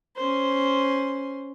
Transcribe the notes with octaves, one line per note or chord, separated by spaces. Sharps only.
C#4 C5